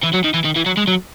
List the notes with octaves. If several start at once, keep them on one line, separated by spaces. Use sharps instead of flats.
E3
F#3
D#3
E3
D#3
E3
F#3
G#3
F#3